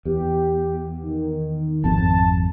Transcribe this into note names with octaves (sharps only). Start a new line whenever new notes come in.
E2 G4
D#3
G#1 F2 C4 A5